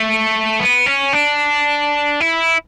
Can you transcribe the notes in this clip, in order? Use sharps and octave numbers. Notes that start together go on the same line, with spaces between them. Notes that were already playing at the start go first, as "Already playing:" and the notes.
Already playing: A3
B3
C#4
D4
E4